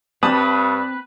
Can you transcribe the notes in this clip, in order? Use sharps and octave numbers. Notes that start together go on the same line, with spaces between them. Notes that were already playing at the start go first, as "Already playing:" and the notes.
G2 C4 B4 A5 D#6